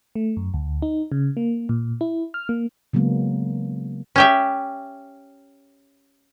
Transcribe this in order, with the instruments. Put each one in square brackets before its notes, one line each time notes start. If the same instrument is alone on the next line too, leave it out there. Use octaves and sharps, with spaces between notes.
[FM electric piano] A3
F#2
D2
D#4
C#3
A#3
A#2
E4
F6
A#3
[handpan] C#3 F#3 G#3 A#3 B3
[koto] C#4 G4 E5